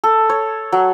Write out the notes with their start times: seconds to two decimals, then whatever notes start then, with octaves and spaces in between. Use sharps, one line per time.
0.04 A4
0.30 C#5
0.72 F#3